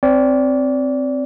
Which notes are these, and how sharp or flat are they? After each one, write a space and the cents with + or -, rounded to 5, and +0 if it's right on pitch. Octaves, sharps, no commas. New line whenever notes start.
C4 +0 D5 -25